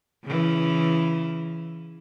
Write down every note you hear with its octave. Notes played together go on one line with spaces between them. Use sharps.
C#3 E3